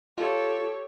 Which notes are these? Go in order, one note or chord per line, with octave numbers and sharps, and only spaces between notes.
F4 G4 A4 C#5